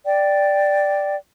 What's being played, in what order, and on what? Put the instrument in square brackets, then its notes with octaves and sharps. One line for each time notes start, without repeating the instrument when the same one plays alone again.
[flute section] D5 G5